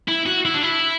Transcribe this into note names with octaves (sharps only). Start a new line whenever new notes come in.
E4
F#4
E4
D4
E4